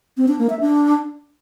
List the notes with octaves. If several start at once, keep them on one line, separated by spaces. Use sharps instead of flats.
C4
D4
A#3
E5
D4